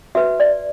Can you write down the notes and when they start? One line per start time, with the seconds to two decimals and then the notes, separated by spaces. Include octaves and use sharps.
0.15 F#4 B4 E5
0.40 D5